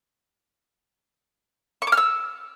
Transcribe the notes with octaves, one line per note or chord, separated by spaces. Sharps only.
C#6
D6
F6
E6